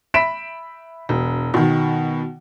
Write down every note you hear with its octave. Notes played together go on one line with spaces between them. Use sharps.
E5 B5 B6 D7 E7
E1
B2 D#3